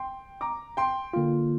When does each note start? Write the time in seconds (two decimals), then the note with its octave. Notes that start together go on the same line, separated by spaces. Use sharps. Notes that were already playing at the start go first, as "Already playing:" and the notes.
Already playing: G5 C6
0.41 A#5 D6
0.77 G5 C6
1.13 D3 A#3 F4